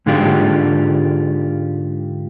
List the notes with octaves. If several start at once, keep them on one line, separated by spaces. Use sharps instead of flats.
G#2 D3 G#3 D4 F4 G4